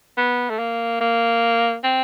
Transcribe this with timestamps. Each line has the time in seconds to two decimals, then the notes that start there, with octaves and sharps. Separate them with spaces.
0.18 B3
0.50 A3
0.59 A#3
1.01 A#3
1.84 C4